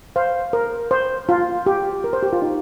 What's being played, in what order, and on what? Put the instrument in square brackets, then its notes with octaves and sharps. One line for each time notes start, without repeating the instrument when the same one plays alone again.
[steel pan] C5 F5
A#4
C5
F4
G4
A#4
C5
G4
F4
D#4